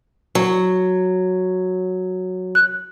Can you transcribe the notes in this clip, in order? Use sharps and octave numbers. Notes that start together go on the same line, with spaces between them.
F#3
F#6